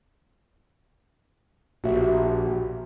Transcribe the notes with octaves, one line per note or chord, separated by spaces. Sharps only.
A#1 F#4 G4 E5